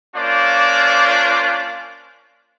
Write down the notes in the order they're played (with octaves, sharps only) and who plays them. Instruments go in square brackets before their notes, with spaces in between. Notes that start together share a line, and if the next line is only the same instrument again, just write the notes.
[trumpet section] A#3 C#4 D4 F4 C5 D5